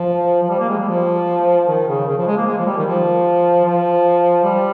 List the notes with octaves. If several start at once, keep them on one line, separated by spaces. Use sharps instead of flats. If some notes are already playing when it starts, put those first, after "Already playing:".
Already playing: F3
F3
G3
A#3
G#3
G3
F3
D#3
C#3
C#3
F3
G#3
A#3
G#3
F3
G3
D#3
F3
F3
G3